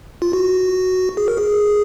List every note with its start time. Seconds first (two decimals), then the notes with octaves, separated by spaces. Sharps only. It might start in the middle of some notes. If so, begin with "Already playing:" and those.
0.22 F4
0.33 F#4
1.17 G#4
1.28 A#4
1.37 G#4